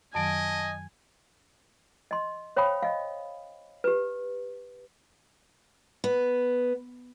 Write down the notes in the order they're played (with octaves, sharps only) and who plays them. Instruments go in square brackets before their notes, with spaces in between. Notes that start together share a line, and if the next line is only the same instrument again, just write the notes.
[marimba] F#2 D#3 F#3 [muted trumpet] D#5 [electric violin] G#5 [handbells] A5 D7
[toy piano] D#5 C6
C5 C#5 F5 G5 B5 D#6
D#5 F5
G4 B4
[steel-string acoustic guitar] B3